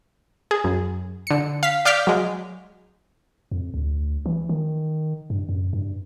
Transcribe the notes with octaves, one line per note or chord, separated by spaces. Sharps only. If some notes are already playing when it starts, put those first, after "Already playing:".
G#4
F#2
D3 C#7
F5 B6
D5 F5 D6 F6 G6 B6
F#3 G#3
F2
D2
E3
D#3
G2
F#2
G2